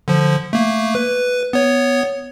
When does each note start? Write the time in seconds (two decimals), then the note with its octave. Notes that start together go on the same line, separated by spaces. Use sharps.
0.08 D3 F3
0.53 A3 A#3
0.95 B4
1.53 B3 C#5